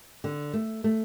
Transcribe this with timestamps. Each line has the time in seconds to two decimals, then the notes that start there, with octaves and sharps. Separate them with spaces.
0.24 D3
0.53 A3
0.84 A3